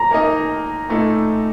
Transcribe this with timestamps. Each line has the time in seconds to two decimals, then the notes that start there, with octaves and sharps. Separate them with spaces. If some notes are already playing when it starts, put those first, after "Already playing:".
Already playing: A#5
0.11 A#3 D#4 A#4 D#5
0.89 A#2 A3 D#4 A4